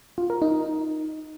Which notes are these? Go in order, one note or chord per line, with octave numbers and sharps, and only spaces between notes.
F4
A#4
D#4